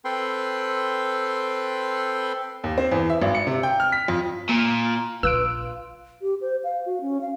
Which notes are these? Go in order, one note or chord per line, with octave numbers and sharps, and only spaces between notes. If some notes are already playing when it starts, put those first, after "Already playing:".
C4 A4 B4 G5 C6
D#2
C4
E2
E5
G#1
C#7
C3
G5
F6
B6
F2
A#2
A#1 F4 B4 E6 F#6 D7
G4
C5
F5
F#4
C#4
F5